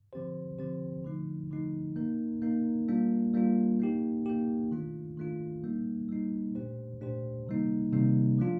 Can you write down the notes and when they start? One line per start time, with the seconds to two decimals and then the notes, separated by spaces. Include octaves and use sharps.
0.13 D3 F3 C4 G4 C5
0.59 D3 F3 C4 G4 C5
1.05 D3 F3 A3 D#4
1.51 D3 F3 A3 D#4
1.96 A#3 D#4 A#4
2.42 A#3 D#4 A#4
2.88 G3 A#3 D4 F4
3.34 G3 A#3 D4 F4
3.80 A#3 D#4 G4
4.26 A#3 D#4 G4
4.72 D#3 A3 D4 F4
5.17 D#3 A3 D4 F4
5.64 G3 A#3 D#4
6.09 G3 A#3 D#4
6.55 A#2 A3 D4 G4 C5
7.01 A#2 A3 D4 G4 C5
7.47 C3 D#3 G3 A#3 D#4
7.92 C3 D#3 G3 A#3 D#4
8.39 F3 A3 D4 F4